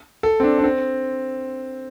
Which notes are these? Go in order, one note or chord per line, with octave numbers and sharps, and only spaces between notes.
A4
C4
D4
D4
C4